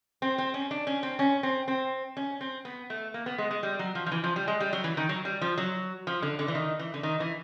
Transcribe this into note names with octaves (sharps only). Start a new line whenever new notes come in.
C4
C4
C#4
D4
C#4
C4
C#4
C4
C4
C#4
C4
B3
A3
A#3
B3
G#3
G#3
G3
F#3
F3
F3
E3
F3
G3
G#3
G3
F#3
E3
D#3
F#3
G3
F3
F#3
F3
D3
D3
E3
D#3
E3
D3
D#3
E3